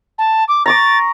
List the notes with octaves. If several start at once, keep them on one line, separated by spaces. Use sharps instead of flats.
A5
D6
A#5 C#6 D6 A6